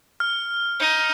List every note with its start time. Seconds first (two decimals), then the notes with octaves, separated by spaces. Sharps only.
0.20 F6
0.80 D#4